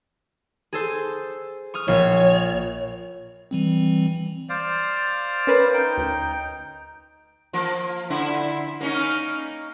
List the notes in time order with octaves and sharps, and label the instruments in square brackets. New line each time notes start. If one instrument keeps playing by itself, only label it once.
[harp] G#4 A4 C5
C#6 D#6 F6
[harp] A#1 [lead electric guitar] C#5
[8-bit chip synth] E3 G3 C4
[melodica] C5 D5 F5
[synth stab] C#4 A#4 B4
[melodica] D#4 G5
[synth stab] D2
[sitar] F3 A#3
D3 E4
A#3 C#4 D#4